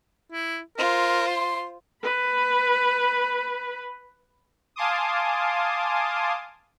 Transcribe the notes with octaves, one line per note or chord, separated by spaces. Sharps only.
E4
F4 A#4 C5
C6
B4 B5
F5 G#5 A5 C6 D6 D#6